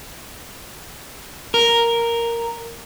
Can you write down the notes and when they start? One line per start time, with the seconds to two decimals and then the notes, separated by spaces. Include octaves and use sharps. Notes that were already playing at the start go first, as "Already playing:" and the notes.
1.54 A#4